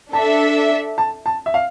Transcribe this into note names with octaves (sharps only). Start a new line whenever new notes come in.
D4 A4 E5 A5
A5
A5
E5
F5